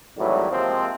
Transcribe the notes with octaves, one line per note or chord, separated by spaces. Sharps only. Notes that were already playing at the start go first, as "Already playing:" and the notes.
G#1 A2 E3 F#3 G3
C3 F3 G#3 A#3 C4